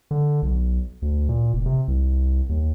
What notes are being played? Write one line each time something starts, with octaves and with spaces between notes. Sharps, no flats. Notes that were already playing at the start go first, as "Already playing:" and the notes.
D3
B1
D2
A#2
F1
C3
C2
D#2